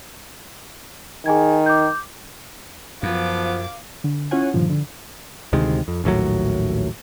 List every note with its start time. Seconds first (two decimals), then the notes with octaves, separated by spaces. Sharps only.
1.26 D#3 G#4 G#5 G#6
1.66 D6 G6
3.03 F#2 F3 B3 F5 D6
4.04 D3
4.31 C#4 E4 F4 C#5 F#5 G#5
4.54 G2 A#2 D3 D#3 F3
4.70 D3
5.53 D2 C3 D#3 G#3
5.88 F2
6.04 A#1 D#2 A2 F#3